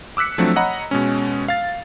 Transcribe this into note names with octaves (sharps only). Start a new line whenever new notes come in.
D6 E6 F#6 B6 C#7
F3 F#3 A3 C4 D4
C#5 D#5 F#5 A#5 B5
B2 G#3 C#4
F5 A6